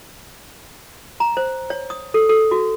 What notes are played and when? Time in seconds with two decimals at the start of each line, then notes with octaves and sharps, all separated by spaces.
1.20 A#5
1.37 C5
1.70 C#5
1.90 D#6
2.14 A4
2.29 A4
2.51 F#4